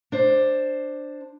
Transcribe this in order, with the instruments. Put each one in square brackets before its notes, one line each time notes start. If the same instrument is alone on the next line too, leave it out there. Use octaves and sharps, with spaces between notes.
[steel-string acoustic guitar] D4 C5